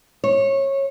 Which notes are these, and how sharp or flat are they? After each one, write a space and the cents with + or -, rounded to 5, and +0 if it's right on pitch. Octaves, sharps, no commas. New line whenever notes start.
C#5 -20